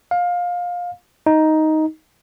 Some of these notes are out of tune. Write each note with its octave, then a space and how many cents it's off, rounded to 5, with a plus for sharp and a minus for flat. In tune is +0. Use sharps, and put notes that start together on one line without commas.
F5 +20
D#4 +5